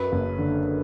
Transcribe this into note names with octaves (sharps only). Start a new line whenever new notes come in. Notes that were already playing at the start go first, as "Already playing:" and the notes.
Already playing: F#2 B4
F#1
D3